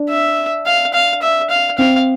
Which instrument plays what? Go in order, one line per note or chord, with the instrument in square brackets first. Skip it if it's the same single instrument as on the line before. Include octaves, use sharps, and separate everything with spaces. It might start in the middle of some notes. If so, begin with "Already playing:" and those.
Already playing: [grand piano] D4
[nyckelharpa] E5
F5
F5
E5
F5
[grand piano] C4 [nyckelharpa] F5